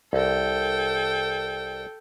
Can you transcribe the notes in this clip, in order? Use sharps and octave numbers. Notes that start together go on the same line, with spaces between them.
C2 A4 G5